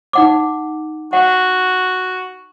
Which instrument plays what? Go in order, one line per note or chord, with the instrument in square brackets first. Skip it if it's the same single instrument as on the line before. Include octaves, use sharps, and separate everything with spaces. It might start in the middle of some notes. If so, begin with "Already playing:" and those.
[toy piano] D#4 F#5 D6
[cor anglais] F#4 [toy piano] F#5